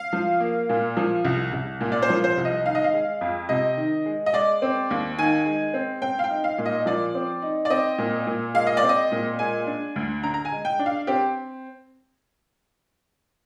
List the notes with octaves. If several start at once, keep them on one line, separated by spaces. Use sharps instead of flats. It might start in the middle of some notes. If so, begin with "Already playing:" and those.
Already playing: F5
F3
A#3
A#2
F3
C2
C2
A#2
D5
C5
F3
C5
C2
D#5
D#3 F5
D#5
F5
G#3
F2
C3 D#5
D#3
G#3
D#5
G#3 D5
C4
D#2
D#3 G#5
G#3
C4
C4 G5
F5
G5
D#4
F5
A#2
D#5
F3 D5
C4
D#4
D5
C4 D#5
A#2
A#2
G#3 F5
D#5
D5
C4
D#5
A#2
G#3 G#5
D4
D2
D3 A#5
A#5
G#5
G#3
G5
D4
F5
C4 G4